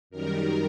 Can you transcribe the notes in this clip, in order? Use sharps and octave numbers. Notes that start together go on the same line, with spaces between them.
F#2 D#3 G3 A#4